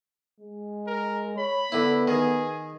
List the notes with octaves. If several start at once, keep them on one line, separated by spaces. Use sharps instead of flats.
G#3
A#4
C#5 B5
D3 B3 E4
D#3 G#4